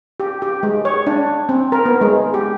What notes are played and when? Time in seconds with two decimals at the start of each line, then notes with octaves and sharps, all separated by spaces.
0.20 G4
0.42 G4
0.63 G#3
0.85 C#5
1.07 D4
1.49 C4
1.72 A#4
1.85 B3
2.01 G#3
2.34 G4